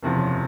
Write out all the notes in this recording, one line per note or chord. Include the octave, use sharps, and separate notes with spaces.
F#1 E2 C3 F3
C#5